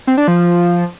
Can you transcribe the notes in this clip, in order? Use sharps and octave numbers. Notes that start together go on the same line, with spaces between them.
C4
D4
F3